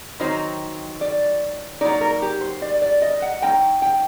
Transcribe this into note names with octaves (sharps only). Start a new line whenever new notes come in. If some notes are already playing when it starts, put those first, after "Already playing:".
D#3 F#3 C4 D#4 C5
D5
F#3 A#3 D#4 D5
A#4
G4
C5
D5
D5
D#5
F#5
F#3 A#3 D#4 G5
G5